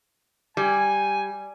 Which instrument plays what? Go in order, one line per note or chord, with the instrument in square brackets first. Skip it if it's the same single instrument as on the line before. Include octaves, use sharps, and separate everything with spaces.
[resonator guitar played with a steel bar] G3 [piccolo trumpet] G#5